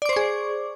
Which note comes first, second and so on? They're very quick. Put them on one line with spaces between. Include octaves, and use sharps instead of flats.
D5 D6 C5 C#6 G#4